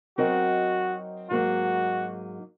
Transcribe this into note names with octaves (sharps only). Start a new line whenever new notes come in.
F#3 C4 D#4 F#4 A#4 D#5
G#2 F#3 A#3 D#4 F#4